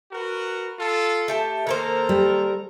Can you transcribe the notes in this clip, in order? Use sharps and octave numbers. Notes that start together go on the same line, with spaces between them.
F#4 A#4 B4
F4 A4
A3 G4 A5
D#3 A#3 A4 A#4 C5 A#5
G3